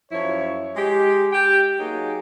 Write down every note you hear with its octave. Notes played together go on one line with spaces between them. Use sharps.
F#2 F3 E4 C#5
G#3 G4
G4 G5
F#3 A#3 D#4 G#4